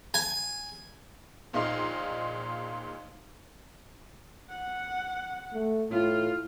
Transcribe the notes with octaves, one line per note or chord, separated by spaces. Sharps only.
G#5
A#1 A#2 D#4 D#5 F5 C6
F#5
A3
A2 F4